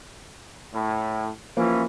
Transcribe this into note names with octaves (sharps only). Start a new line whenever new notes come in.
A2
A1 E3 F3 A#3 C#4